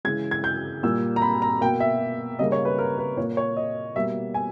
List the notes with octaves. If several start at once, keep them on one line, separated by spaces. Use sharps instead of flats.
C#3 E3 G#3 G#6
G#6
G6
A#2 G3 A#3 E6
A#5
B5
A#5
B2 A#3 G5
E5
C#3 G3 A#3 D#5
C#5
B4
A#4
B4
A#2 A#3 C#5
C#5
D#5
B2 G3 A#3 E5
G#5